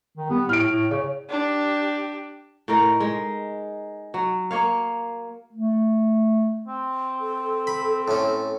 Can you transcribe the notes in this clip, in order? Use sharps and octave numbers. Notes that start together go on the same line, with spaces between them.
D#3
G3 B3
A2 F6 D7
A2
C#3 C#5
D4 G4
A2 D#4 A#4
G#3
F#3
A#3 C#5 F5
A3
C4
A4
B5
A2 C#4